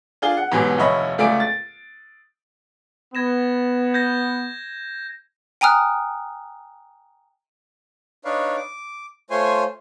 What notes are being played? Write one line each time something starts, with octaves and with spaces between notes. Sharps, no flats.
D4 F4 G#4 G7
F#5
G#2 B2 E3 F#3 G4 G#5
F1 D#2 E4 C#5 D#5 B5
C#2 A3 D5 G#5 D7
A6
B3 G#6 A#6 E7
G6 G#6 A#6
G5 G#5 A#5 D#6 F6 F#6
D4 D#4 B4 C#5 D5 F5
D6
A3 F4 C5 C#5 G#5 C6